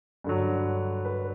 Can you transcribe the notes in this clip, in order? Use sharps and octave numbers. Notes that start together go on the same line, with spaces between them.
G2 D3 F#3
B4